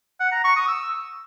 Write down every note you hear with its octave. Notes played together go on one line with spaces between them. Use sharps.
F#5
A#5
C#6
D#6
E6